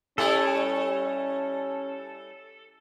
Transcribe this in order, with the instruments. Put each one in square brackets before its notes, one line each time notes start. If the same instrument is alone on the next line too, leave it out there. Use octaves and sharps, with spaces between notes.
[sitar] G3 A3 E4 [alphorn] C#4 [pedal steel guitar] A4